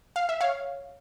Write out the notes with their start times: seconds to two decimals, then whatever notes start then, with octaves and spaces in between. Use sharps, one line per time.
0.16 F5
0.29 E5
0.41 C#5 F5